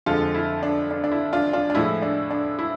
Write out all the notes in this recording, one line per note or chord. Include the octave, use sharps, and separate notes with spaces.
F2 D3 F3 G#3 F4 A4
E4
D4
D4
D4
E4
D4 F4
D4 F4
D4
A2 F3 G#3 E4
D4
D4
E4